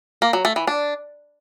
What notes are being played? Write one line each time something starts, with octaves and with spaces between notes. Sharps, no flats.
A#3
F#3
A3
E3
D4